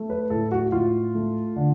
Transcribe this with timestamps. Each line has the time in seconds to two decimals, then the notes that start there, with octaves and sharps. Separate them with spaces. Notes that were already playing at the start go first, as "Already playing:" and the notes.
Already playing: A3
0.10 B4
0.30 A2 A4
0.52 F#4
0.72 A2 F4
1.15 A3
1.56 D3